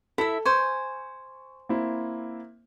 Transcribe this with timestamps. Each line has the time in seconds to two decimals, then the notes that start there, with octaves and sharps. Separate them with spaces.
0.18 E4 A4 E5
0.45 C5 G#5 C#6
1.69 A#3 C4 E4